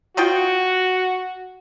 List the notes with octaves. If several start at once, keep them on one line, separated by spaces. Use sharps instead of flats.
D#4 F4 F#4 G5